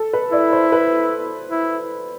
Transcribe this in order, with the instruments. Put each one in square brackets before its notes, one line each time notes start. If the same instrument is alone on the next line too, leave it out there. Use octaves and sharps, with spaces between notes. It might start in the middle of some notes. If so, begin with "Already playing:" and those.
Already playing: [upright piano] A4
B4
[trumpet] E4 [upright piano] D5
[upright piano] C5
B4
[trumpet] E4